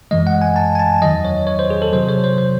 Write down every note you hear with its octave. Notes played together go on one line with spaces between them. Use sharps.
F#2 E3 G#3 D#5
F#5
G#5
A5
G#5
A5
E2 D#3 F#3 D#5
C#5
C#5
C5
G#4
A4
C3 F#3 C5
C#5
C5
C5